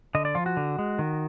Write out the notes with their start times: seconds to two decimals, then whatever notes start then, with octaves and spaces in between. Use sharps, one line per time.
0.15 D3 D#5
0.25 D5
0.35 F3 F4
0.46 F#4
0.57 D3
0.79 G#3
0.99 D#3